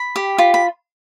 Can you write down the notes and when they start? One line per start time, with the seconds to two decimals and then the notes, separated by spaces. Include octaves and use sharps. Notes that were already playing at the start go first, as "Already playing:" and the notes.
Already playing: B5
0.16 G4
0.38 F4 B5
0.54 B5